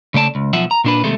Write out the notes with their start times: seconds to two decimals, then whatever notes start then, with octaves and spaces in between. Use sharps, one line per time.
0.14 C#3 A3 D5 A5
0.35 C#2
0.53 B1 F3 E5 F#5
0.71 A#5
0.84 A#2 D4 B4
1.04 D#2 C3 G#3 A3